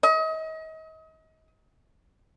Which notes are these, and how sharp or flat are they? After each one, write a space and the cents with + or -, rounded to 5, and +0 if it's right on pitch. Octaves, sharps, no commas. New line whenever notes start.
D#5 +35